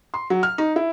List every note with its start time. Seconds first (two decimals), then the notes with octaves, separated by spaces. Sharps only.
0.14 C6
0.30 F#3
0.43 F6
0.58 D#4
0.76 E4